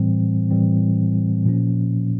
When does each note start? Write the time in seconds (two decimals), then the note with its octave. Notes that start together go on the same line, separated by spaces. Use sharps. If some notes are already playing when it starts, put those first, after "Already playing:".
Already playing: A2 E3 G3 C4
0.51 A2 E3 G3 C4
1.45 A#2 F3 A#3 C#4